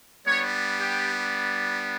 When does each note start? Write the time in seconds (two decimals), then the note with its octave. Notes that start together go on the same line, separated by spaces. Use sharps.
0.24 G3 B3 D4 C#5
0.78 G4